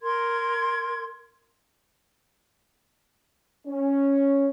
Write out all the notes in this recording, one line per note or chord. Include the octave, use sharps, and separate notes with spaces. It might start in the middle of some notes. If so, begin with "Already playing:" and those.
A#4 C6 G#6
C#4